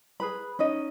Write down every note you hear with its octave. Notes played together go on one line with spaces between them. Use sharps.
G#4 B4 B5
C#4 D#4 D#5